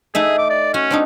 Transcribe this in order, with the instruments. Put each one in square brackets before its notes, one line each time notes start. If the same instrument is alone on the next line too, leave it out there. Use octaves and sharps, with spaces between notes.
[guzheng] A3 D#4 E5 [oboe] G#4
[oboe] D6
D5
[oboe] C#4 [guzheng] F#4
[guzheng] C4 D4 D#4